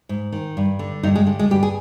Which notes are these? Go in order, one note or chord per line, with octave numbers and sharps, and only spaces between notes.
G#2
D#3
G2
D3
G2 D#4
G#3
D3
G#3
G2 G4
G#4